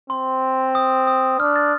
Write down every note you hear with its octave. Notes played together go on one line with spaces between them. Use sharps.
C4 C6
D#6
D#6
D4 F6
A6